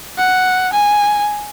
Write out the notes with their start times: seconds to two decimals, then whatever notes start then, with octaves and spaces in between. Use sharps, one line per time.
0.18 F#5
0.73 G#5